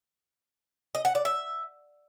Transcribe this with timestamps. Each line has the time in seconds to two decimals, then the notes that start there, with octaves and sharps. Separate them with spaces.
0.95 D#5
1.05 F#5
1.15 D5
1.25 E5